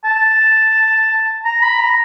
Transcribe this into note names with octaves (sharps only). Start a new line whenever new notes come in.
A5
A#5
B5
A#5